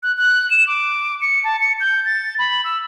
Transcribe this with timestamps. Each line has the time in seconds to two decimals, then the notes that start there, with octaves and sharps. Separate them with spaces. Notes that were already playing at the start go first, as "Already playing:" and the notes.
0.03 F#6
0.17 F#6
0.50 E7
0.67 D6
1.22 C#7
1.44 A5
1.61 C#7
1.80 G6
2.05 A6
2.39 B5
2.64 E6